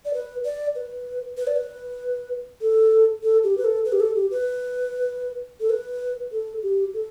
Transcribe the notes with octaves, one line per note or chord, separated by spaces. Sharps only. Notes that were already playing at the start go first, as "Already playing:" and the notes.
D5
B4
D5
B4
B4
D5
B4
A4
A4
G4
B4
A4
B4
G4
A4
G4
B4
A4
B4
A4
G4
A4